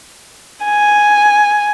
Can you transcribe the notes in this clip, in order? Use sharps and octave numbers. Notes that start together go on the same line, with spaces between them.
G#5